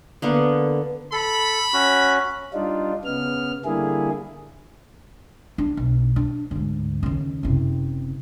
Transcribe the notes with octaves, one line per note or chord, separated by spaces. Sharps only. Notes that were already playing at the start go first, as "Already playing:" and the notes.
D3 A#3 B3
A4 B5
C#4 F#4
G3 D4 D#4 F4
C#3 B3 F6
D3 G3 A#3 E4 G#4
D4
B1
D4
D2 G#2
D#2 C#3
F#1 C3